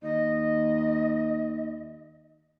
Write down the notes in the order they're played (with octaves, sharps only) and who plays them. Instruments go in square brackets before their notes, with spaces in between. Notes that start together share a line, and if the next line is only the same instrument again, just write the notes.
[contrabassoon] D#2 [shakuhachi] D#5